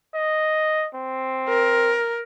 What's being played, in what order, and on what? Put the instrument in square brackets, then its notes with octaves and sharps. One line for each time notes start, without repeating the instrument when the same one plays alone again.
[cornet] D#5
C4
[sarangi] A#4